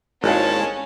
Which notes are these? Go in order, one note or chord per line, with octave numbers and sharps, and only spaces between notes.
G#1 D#2 G#3 C#4 E4 G#4 A5